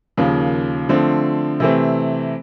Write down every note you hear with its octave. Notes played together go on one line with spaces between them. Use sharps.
D#2 C#3 F3 A#3
D3 F3 A3 C4
C3 E3 A3 C4